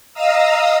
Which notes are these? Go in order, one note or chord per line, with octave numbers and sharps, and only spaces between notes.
D#5 F5 A#5 D#6 E6